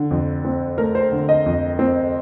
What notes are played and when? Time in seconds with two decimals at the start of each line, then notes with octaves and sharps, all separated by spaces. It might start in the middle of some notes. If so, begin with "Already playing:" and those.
Already playing: D3
0.11 F2
0.45 C4
0.78 A3 A#4
0.95 C5
1.12 D3
1.29 D#5
1.46 F2
1.79 C4